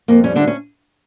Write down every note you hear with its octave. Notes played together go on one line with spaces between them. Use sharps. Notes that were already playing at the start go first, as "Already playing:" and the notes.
F2 A#3
G3 C#4
D3 D4
D2
C#4